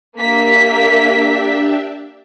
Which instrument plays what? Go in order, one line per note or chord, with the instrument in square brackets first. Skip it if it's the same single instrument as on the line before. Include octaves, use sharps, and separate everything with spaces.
[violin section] A#3 B6 [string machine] D4 G4 E5